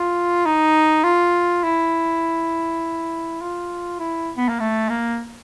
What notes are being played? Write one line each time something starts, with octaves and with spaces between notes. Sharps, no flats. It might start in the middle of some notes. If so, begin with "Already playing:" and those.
Already playing: F4
D#4
F4
E4
F4
E4
B3
A#3
A3
A#3